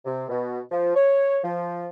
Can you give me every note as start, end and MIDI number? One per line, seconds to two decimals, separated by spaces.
0.05 0.25 48
0.29 0.60 47
0.72 0.93 53
0.96 1.38 73
1.43 1.88 53